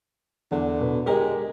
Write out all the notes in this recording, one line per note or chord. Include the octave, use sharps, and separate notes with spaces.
E2 D3
B2 B4
G#3 G4 A#4 D#5